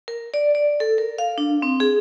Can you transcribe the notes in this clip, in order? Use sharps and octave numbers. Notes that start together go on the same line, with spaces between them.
A#4
D5
D5
A4
A#4
F5
D4
C4
G#4